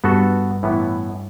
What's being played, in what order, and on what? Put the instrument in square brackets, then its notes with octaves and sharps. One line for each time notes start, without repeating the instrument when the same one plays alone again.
[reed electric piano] G2 [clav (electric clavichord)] B3 F#4 A4
[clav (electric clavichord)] A2 E3 B3